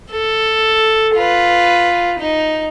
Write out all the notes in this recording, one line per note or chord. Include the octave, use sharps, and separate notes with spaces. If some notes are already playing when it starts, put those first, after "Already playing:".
A4
F4 B4
D#4